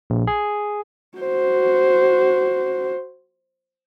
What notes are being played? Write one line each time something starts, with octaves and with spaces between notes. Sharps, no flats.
A#1
G#4
F#4 C5